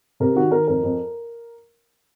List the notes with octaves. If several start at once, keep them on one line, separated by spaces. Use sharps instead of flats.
C3 A#4
D#3 F#4
D#3 A#4
F2 A#4
F2